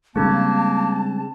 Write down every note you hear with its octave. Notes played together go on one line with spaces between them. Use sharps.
C#3 G3 G#3 A#3 C4 D4 A5